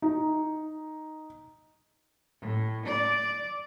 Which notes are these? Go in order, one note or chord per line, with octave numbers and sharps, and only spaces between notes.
D#4
A2
D5